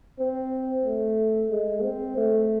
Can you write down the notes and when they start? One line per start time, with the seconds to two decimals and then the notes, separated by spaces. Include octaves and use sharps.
0.19 C4
0.85 A3
1.51 G#3
1.83 C4
2.17 A3